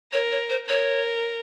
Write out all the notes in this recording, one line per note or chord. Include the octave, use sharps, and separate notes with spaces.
A#4 C#5
C#5
C5
A#4 C#5